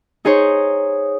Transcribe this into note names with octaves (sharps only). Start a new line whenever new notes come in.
D#4 G#4 C5 C#5